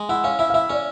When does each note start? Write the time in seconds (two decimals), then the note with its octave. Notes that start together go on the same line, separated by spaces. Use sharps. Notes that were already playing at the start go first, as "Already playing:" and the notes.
Already playing: G#3
0.09 E4 F#5
0.24 C#4 F5
0.39 E4 E5
0.50 F5
0.54 E4 E5
0.70 C#4 D5